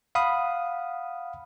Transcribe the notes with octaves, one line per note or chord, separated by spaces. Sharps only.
F5 F#5 B5 D#6